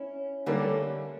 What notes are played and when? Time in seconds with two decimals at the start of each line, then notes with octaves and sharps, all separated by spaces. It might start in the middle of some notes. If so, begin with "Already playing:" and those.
Already playing: C#4 E4
0.46 D3 G3 A3 A#3 C#4 D4